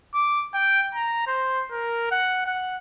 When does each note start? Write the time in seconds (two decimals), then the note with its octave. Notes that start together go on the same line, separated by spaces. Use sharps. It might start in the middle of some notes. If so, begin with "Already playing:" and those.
0.14 D6
0.54 G5
0.95 A#5
1.27 C5
1.71 A#4
2.11 F#5
2.46 F#5